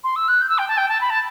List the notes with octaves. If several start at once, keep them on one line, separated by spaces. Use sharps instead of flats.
C6
E6
F#6
G6
E6
G5
A5
G5
A5
B5
A5